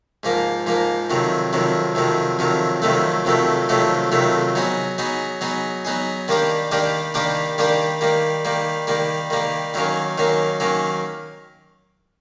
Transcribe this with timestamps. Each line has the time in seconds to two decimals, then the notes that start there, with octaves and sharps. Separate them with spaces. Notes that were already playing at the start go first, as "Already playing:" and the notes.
0.23 G#2 F3 A#3
0.66 G#2 F3 A#3
1.10 F2 C3 D#3 F#3
1.53 F2 C3 D#3 F#3
1.95 F2 C3 D#3 F#3
2.39 F2 C3 D#3 F#3
2.82 F2 C3 D#3 F#3 A3
3.25 F2 C3 D#3 F#3 A3
3.69 F2 C3 D#3 F#3 A3
4.12 F2 C3 D#3 F#3 A3
4.55 F#3 B3 D#4 G#4
4.98 F#3 B3 D#4 G#4
5.41 F#3 B3 D#4 G#4
5.85 F#3 B3 D#4 G#4
6.28 D#3 G3 A#3 D4 G4
6.71 D#3 G3 A#3 D4 G4
7.14 D#3 G3 A#3 D4 G4
7.58 D#3 G3 A#3 D4 G4
8.01 D#3 G3 A#3
8.45 D#3 G3 A#3
8.87 D#3 G3 A#3
9.30 D#3 G3 A#3
9.74 D#3 F#3 A#3 C#4
10.18 D#3 F#3 A#3 C#4
10.60 D#3 F#3 A#3 C#4